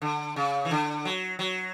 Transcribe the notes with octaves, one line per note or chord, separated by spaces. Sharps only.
D3
C#3
E3
D3
F#3
F#3